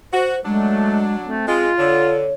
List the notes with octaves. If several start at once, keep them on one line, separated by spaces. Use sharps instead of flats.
F#4 C5
F#3 G#3 A3 D4
A3 C4
G#3 F4
D3 C#5